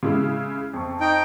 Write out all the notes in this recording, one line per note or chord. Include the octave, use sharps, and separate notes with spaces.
C#3 G#3 E4
F2 C#6
D#4 G5